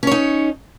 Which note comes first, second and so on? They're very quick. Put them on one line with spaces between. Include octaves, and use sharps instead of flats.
C#4 C#5 D#4